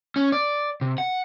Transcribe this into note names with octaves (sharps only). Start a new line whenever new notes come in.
C#4
D5
C3
F#5